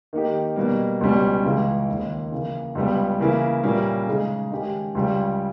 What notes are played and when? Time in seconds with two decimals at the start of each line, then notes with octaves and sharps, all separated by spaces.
0.13 D#3 A#3 D#4 G4
0.56 B2 G3 A#3
1.01 C#2 B2 G3 C#4
1.44 C#2 C#3 E3 G#3
1.88 D#2 D#3 A#3
2.32 C#3 E3 A#3
2.75 C#2 C#3 G3 B3
3.20 C#3 E3 A#3 E4
3.63 A#2 G3 A#3 C#4 E4
4.07 C#3 G#3 D#4 G#4
4.51 D#3 G#3 C#4 G4
4.95 C#2 C#3 G3